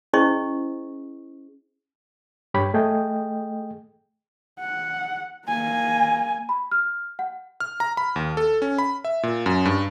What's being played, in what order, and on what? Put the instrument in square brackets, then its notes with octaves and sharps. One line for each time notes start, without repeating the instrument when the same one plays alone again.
[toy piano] C#4 E4 G#4 C5 D#5 C#6
[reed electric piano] G2 G4 C#5 B5
A3 G#4 D#5 G5
[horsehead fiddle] F#5
A#3 G#5
[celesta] B5
F6
F#5
[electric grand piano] F6
A#5
B5
D#2
A4
C#4
B5
E5
A#2
F#2
G2